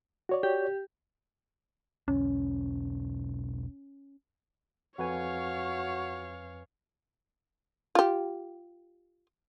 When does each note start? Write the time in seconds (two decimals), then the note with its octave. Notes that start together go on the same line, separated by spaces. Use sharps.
0.29 F#4 C#5 D5
0.43 G4
2.08 E1 B1 C#4
4.99 F2 F#4 B4 C#5 F5 G#5
7.95 F4 G4